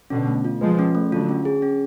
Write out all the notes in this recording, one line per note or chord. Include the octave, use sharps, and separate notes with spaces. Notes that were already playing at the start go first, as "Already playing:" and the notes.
B2 D3 C#4
A3
F4
F3 G#3 B4
C#4
A3
D3 F#3 F4
C#4
G#4
C#4